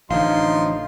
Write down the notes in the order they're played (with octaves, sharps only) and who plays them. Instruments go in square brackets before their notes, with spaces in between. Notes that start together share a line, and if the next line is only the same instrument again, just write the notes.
[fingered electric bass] A1 D3 [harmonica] F3 C6 [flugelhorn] D#4 [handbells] F5